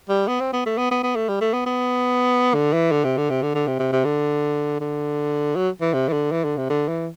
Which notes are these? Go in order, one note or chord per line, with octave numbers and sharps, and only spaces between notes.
G3
B3
C4
B3
A3
B3
B3
B3
A3
G3
A3
B3
B3
D3
E3
D3
C3
D3
C3
D3
D3
C3
C3
C3
D3
D3
F#3
E3
C3
E3
D3
E3
D3
C3
D3
E3